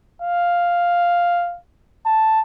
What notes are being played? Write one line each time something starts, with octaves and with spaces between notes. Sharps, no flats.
F5
A5